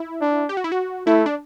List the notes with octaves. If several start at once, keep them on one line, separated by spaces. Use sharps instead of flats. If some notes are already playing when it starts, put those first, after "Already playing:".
Already playing: E4
D4
G4
F#4
E4
F#4
A3 E4
D4